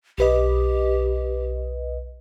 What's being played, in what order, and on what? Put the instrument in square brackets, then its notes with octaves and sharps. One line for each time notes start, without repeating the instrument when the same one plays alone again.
[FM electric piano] B1 B4 D#5 [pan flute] G4